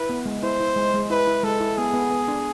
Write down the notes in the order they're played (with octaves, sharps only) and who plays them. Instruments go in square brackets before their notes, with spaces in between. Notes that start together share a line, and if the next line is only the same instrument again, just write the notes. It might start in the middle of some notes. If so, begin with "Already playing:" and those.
Already playing: [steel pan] E4 [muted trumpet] B4
[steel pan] B3
G#3
[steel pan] E4 [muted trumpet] C5
[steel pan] E4
G#3
G#3
[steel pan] E4 [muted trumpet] B4
[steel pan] E4
[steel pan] G#3 [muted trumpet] A4
[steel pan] E4
[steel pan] B3 [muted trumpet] G#4
[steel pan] B3
B3
D4